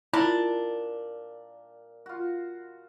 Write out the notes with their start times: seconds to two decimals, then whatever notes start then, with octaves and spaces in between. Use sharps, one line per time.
0.14 A#2 D4 E4 A#5 B5
2.06 F4 F#4